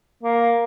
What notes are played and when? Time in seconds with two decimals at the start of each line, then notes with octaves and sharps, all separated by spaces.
0.24 A#3